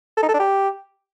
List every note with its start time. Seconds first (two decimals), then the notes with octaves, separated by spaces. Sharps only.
0.17 A4
0.23 D#4
0.28 A4
0.34 D4
0.40 G4